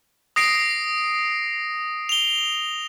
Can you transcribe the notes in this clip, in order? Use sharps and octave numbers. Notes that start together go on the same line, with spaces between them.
D#6 A#6 C7 D7
F7 G7